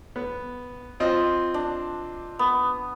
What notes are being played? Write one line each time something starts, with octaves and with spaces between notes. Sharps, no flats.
B3
C4 F4 D#5
D4
B3